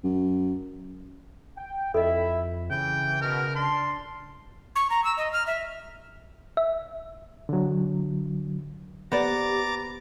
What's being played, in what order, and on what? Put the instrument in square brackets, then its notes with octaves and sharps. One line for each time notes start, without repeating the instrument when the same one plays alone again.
[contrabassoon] F#2
[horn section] G5
[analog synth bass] F2 [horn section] E4 E5 [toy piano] A4 D#5
[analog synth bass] C#3 [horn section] E3 [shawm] G5
[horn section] B2 [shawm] A#4
[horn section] D4 A5 [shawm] C6
[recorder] C#6
A#5
E6
D#5
F6
E5
[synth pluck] E5
[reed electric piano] D3 F#3
[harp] B3 [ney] G4 [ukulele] C5 D5 [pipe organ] A#5 D6 A6